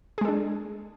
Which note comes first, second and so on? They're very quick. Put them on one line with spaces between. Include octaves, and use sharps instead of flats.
G#4 G#3 A4 D4